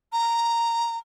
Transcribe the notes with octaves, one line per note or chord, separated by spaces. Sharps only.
A#5